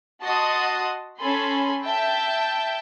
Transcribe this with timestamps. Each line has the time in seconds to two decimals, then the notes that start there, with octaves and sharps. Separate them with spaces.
0.24 F#4 D#5 F#5 A5 C6 D#6
1.20 C#4 A4 G#5 B5 C6
1.84 E5 G5 A5 G6